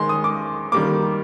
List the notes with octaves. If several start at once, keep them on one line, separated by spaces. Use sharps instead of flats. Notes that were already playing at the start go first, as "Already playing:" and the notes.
Already playing: D#3 G#3 C6
D#6
D6
D#3 G3 A#3 D6